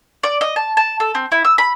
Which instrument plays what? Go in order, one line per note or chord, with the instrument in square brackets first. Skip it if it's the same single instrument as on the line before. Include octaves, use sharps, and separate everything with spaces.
[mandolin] D5
D#5
A5
A5
A4
C4
E4
E6
B5